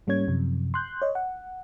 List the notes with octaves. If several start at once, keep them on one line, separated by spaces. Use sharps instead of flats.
G#2 G3 A#3 C#4 C#5 G#6
F#2 C3 F3
C6 F#6 G6
C#5 D#5
F#5